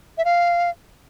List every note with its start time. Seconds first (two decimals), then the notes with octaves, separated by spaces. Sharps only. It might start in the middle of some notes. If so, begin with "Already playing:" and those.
0.18 E5
0.25 F5